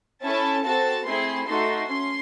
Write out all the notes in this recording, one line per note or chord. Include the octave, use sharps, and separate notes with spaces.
C#4 E4 A4 A5
C4 F#4 A4 A5
A3 C4 E4 G#4 C6
A3 D#4 F#4 A4 C6
C#4 C6